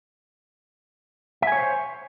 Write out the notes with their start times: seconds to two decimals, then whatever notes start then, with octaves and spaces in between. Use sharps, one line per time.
1.42 E5
1.47 G#5
1.52 C#5
1.57 C5